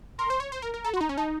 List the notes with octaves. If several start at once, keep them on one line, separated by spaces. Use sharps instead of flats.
A#4 C6
C5
C#5
C5
A#4
A#4
A4 A#5
F#4
C6
D#4 A#5
C#4
D#4 A5